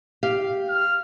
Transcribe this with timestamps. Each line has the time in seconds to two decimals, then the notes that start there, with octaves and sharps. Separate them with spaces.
0.23 G4 F5
0.69 F6